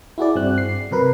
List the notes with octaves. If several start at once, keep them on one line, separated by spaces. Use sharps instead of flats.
E4 F#4 G#4 D5
G2 C4 F#6
C7
C3 F#3 A#4 B4